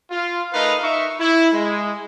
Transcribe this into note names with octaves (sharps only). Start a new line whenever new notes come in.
F4
A3 D#4 A#4 B4 D#5 F5
D#4 E5 C#6
E4
G#3